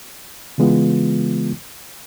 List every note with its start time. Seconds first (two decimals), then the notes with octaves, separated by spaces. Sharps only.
0.58 C#3 E3 G#3 B3 F4